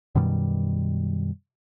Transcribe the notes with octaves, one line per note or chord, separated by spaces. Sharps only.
F#2 B2 D#3 G3